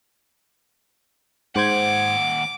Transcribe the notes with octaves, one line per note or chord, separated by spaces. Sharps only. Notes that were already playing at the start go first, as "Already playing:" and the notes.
D#2 G#2 C5 F#5 D6 G#6